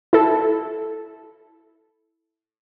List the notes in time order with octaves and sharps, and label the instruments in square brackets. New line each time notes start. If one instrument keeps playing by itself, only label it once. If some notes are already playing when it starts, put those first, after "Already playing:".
[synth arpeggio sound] E4 A4